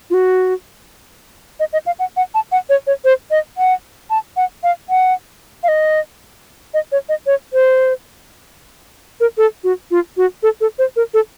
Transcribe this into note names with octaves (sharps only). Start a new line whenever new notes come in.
F4
F#4
D#5
D#5
F5
F#5
F#5
A5
F#5
C#5
C#5
C5
D#5
F#5
A5
F#5
F5
F#5
F5
D#5
D#5
C#5
D#5
C#5
C5
A#4
A4
F#4
F4
F#4
A4
A4
C5
A#4
A4